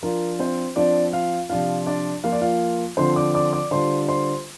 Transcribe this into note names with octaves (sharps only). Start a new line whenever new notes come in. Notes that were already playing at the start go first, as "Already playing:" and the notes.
F3 D4 F4 A#4
C4 C5
F3 C4 D4 F4 D5
F4 F5
C3 F3 D4 F4 F5
D4 D5
F3 A#3 F4 F5
D5
F4 F5
D3 F3 C4 F4 C5 C6
D5 D6
D5 D6
D5 D6
D3 G3 D4 F4 C5 C6
C5 C6